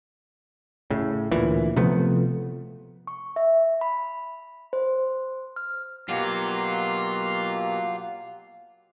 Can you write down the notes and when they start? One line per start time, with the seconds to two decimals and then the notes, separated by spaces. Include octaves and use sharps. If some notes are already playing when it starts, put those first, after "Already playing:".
0.90 A2 C#3
1.32 D2 A#2 E3
1.76 C3 F3 A3 B3
3.07 C#6
3.36 E5
3.81 B5
4.73 C5
5.56 F6
6.09 B2 F#3 A#3 F4 G4